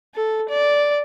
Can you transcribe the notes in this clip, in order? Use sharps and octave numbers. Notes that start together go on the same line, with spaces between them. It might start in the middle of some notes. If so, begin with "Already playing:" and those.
A4
D5